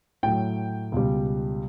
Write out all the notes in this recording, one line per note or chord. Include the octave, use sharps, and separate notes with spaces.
A2 F#3 G5
C#2 B2 G3